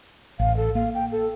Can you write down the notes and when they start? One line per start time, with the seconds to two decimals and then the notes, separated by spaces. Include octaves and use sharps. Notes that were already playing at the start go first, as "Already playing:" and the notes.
0.39 A1 F5
0.57 A4
0.75 A#3 F5
0.94 G5
1.12 A4